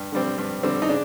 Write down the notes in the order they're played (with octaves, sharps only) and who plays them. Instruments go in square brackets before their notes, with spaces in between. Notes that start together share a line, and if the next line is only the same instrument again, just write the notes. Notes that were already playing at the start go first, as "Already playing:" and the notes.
Already playing: [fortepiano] G2
D3 G3 C4
G2
D3 G3 C4
D#4
C#3 D4